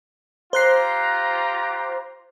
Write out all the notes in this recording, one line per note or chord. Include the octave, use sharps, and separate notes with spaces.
F4 G4 C5 A#5 F#6 C7